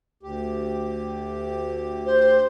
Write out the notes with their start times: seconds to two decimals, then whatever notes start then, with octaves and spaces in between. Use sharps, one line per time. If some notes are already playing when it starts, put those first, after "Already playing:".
0.23 D2 G4
2.05 C5